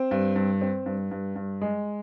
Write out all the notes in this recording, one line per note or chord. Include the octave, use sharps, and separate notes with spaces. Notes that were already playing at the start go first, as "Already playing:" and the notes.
Already playing: C4
G2
G2
C4
G2
G2
G2
G#3